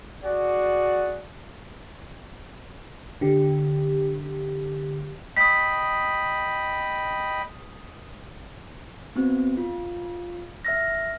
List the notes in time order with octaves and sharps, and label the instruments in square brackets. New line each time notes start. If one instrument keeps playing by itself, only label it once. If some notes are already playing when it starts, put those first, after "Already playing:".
[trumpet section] F#4 G#4 D5 F#5
[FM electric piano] D3 G4
[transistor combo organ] D#5 G5 B5 [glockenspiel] D#6 B6
[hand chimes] B3 C4 F#4
F4
E5 F6 A#6